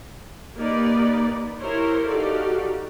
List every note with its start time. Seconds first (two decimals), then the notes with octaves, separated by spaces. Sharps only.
0.56 A#3 D#4 G4 B4 D5
1.59 E4 G4 A#4 C5 C#5
2.07 D#4 F#4 G4 A4 D5 F5